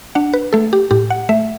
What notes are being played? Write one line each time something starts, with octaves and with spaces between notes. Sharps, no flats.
D4 F#5
B4
A3 A4
G4
A2 G4
F#5
A3 E5